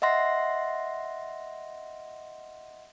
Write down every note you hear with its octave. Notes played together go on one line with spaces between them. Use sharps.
D#5 E5 F#5 C6 A#6